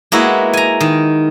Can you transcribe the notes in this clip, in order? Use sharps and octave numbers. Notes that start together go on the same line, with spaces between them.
G#3 A#3 B3 E4 F#4
G#5 A#5
D#3